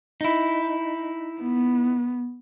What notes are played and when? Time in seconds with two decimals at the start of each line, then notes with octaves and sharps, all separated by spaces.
0.21 D#4 E4
1.41 B3